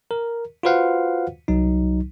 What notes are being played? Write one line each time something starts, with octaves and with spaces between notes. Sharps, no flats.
A#4
F4 F#4 B4 C5 F5 F#5
C2 F#3 D#4